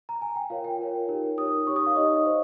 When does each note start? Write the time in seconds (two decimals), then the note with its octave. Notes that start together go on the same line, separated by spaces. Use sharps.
0.09 A#5
0.22 G#5
0.36 G5
0.50 F4 A#4 C#5 F5
0.64 G5
0.79 F4 A#4 C#5
1.08 D#4 G4 A#4 C#5
1.38 D#4 G4 A#4 C#5 D#6
1.67 D#4 G4 C#5 C#6
1.76 D#6
1.86 F5
1.96 D#4 G4 C#5 D#5
2.26 C5